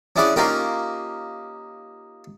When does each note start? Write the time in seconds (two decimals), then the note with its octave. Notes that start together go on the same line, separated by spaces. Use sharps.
0.16 C#4 D4 E4 G#4 F#5 D6
0.36 A#3 C#4 D#4 F4 G4 A#4